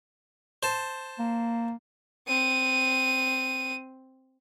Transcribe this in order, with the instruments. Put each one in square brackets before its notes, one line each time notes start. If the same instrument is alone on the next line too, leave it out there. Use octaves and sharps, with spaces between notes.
[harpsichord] C5 A5
[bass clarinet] A#3
[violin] C4 D#7